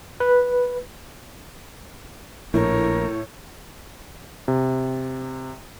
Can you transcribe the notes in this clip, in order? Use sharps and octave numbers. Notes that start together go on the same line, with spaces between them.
B4
A#1 A2 A#4 C#5
C3